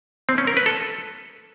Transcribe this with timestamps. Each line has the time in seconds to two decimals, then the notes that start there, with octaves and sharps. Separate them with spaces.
0.29 C4
0.38 C#4
0.47 A#4
0.57 B4
0.66 A4